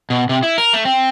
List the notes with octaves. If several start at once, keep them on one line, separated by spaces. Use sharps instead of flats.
B2
C3
E4
A#4
A3
C4